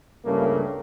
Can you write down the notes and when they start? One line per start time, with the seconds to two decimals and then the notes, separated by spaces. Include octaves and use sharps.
0.25 C#2 G2 C#3 G3 A3 A#3